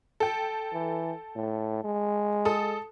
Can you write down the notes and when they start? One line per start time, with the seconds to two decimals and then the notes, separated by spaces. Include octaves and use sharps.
0.20 A4 G5
0.73 E3
1.36 A2
1.84 G#3
2.45 A4 D#6